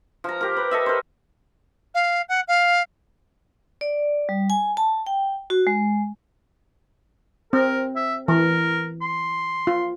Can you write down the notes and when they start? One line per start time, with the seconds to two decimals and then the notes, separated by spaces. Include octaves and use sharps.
0.24 F3 A#5
0.41 G4 A#4
0.57 B4
0.71 A4 D#5 E5
0.86 A#4 C5
1.94 F5
2.29 F#5
2.48 F5
3.81 D5
4.29 G3
4.50 G#5
4.77 A5
5.06 G5
5.50 F#4
5.67 G#3
7.53 C4 A#4
7.96 E5
8.28 E3 A#4
9.01 C6
9.67 F4